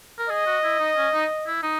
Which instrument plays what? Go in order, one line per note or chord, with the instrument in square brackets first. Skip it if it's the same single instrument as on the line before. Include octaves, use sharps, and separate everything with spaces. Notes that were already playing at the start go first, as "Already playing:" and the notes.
[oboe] A#4
[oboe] G#4 [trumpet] D#5
[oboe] F#4
E4
D#4
C#4
D#4
E4
D#4